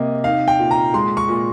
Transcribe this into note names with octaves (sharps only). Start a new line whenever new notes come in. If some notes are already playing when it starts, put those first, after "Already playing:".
Already playing: C3 A#3 D#5
D#4 F5
G5
A#2
A#5
G#3 C6
C#6
A#2